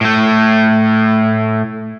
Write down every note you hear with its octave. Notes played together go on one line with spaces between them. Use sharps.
A2 A3